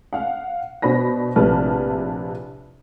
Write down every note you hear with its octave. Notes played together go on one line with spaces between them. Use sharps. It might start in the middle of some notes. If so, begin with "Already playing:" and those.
F5 F#5
B2 D4 C5 B5 A#6
A#1 A2 C3 B4 A5 F6